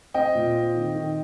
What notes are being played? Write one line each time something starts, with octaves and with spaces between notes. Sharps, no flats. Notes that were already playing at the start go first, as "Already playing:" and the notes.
C4 D#5 G5
A#2
C4
D#3
D#3